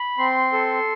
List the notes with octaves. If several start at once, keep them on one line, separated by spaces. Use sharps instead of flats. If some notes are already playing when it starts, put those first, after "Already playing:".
Already playing: B5
C4 C6
A4